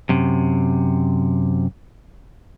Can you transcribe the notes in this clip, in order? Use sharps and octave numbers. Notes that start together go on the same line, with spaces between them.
F#2 C3